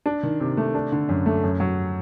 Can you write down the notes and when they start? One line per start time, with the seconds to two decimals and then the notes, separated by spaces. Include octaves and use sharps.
0.06 D4
0.23 D#3
0.40 C3
0.57 A3
0.75 D4
0.92 D3
1.09 F#2
1.26 A3
1.44 F#2
1.60 F#3